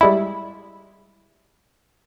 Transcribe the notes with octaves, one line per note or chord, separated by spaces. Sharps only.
G3 G#3 E4